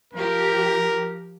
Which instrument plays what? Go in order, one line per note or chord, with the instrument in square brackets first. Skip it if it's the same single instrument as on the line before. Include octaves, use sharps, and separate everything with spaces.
[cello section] F3 G4 [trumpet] A#4